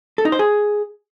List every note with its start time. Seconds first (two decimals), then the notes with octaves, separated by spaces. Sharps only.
0.18 A4
0.25 D#4
0.32 C5
0.39 G#4